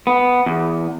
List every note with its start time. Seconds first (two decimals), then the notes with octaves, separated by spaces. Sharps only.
0.07 B3
0.46 E2